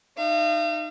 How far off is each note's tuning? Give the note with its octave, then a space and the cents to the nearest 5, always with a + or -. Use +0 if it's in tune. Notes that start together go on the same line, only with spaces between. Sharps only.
D#4 -25 F5 -45